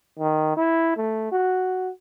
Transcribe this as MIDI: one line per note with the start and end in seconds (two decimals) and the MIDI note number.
0.19 0.52 51
0.56 0.95 64
0.97 1.30 57
1.32 1.90 66